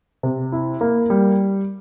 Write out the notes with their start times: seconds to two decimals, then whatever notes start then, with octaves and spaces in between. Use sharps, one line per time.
0.23 C3
0.52 E4
0.81 A#3
1.10 G3